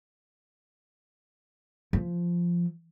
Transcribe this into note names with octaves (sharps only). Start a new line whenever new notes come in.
F3